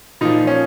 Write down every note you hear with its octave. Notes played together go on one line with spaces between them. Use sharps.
A#2 F3 D#4
C#4